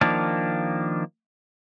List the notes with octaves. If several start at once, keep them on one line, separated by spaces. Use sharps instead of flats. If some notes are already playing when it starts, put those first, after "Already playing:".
D#3 F3 A#3 D4